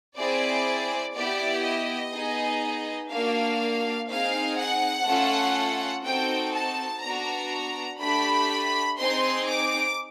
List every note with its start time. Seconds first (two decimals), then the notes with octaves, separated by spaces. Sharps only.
0.17 C4 E4 G#4 D5
1.15 B3 E4 G4 D5
1.64 D#5
2.13 B3 D#4 G#4
3.11 A#3 D4 F#4 F5
4.09 C4 D#4 G#4 F5
4.58 F#5
5.06 A3 C#4 F4 A4
6.04 C4 D#4 F#4 A4 G5
6.54 A5
7.02 B3 D4 F#4 A#5
8.00 A3 D4 G4 B5
8.98 C4 D#4 G#4 C6
9.47 D6